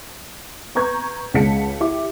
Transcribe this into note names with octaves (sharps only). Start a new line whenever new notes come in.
B4 A#5 C#6 G6 G#6
C#2 C#3 F#5 A5 B6 C#7
E4 G4 E5 D6